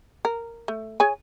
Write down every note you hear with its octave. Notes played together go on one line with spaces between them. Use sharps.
A#4
A3
G#4 C#5 G#5